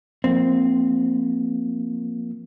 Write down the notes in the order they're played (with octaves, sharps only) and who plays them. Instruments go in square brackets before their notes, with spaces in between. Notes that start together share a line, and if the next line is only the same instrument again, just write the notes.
[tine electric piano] F3 A#3 [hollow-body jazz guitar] C4